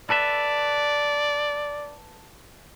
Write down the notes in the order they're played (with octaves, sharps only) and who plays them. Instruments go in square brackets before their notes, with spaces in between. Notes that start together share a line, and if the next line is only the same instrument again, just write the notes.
[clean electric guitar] A4 B4 E5 [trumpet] D5